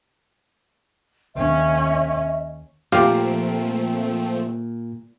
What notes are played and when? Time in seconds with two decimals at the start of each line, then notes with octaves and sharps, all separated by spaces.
1.35 D#2 C#4 D#5 E5
2.92 A#2 F3 A3 C4 F4 G4 F5